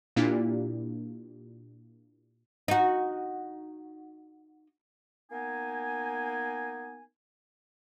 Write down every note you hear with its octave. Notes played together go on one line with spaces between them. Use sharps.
A#2 A#3 D4 E4 F4 G4
D#4 F#4
A#3 B3 D#4 G#5